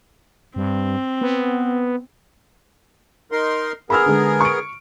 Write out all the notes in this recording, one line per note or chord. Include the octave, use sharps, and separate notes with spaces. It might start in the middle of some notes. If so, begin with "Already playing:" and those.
G2 C4
B3
D#4 A#4 C6
B3 G#4 A#4 B5 E6 F6
D3 G#3
C#6 D7